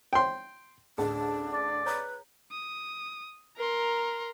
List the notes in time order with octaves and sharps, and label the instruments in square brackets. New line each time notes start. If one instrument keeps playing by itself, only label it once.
[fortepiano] G5 C6
[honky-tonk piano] A1 D2 A5 [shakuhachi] D4 [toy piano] G#4
[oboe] D5
[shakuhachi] B4 [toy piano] C#5 A#5
[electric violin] D#6
[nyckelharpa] A#4 [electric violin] A#5 C6